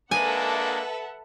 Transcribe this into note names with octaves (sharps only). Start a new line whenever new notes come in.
G#3 A#3 D4 A4 B4 E5 F#5 G#5